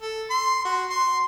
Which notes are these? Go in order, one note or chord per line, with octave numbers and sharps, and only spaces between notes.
A4
C6
F#4
C6